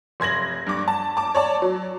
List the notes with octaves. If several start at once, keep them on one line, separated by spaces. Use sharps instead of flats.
F1 C6 G#6 A#6 F#7
G2 D6
A5
A5 D6
C#5 D5 A5
F#3